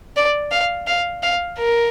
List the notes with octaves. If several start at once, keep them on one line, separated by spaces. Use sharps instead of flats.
D5
F5
F5
F5
A#4